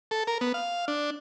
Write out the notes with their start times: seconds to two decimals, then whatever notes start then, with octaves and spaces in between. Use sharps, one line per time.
0.11 A4
0.27 A#4
0.41 B3
0.54 F5
0.88 D4